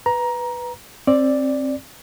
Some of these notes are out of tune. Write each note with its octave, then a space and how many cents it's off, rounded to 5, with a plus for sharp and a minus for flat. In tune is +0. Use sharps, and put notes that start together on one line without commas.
B4 +0 A#5 +15
C4 +25 D5 +0